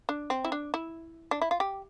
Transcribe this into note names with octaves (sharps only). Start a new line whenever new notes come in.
D4
C4
E4
D4
E4
D4
E4
F4
G4